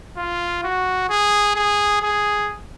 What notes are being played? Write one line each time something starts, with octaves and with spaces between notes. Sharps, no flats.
F4
F#4
G#4
G#4
G#4